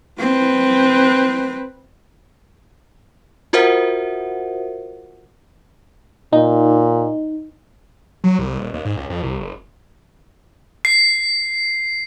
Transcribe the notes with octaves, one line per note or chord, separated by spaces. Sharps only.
C4 B4
F4 F#4 A#4 C5 E5 F#5
A#2 D#4
F#3
C2
D#1
D#2
G#2
C#2
F2
C2
F#1
C7